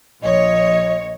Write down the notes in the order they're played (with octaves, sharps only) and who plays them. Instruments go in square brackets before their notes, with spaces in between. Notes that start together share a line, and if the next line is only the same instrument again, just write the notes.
[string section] A#1 C#5 [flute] D#5